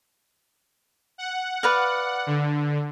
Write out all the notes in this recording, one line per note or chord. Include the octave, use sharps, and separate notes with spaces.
F#5
B4 D5 F5
D3